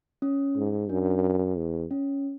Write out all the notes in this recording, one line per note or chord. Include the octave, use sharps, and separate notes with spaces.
C#4
G#2
F#2 D4
E2
C#4